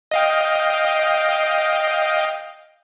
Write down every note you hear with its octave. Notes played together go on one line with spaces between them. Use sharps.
D#5 F5 G5